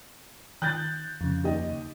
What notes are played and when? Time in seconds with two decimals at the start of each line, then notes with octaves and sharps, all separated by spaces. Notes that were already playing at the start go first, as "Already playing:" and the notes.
0.62 D#3 F#6 G6 A6
1.21 F2 C#3
1.44 D#2 G4 D#5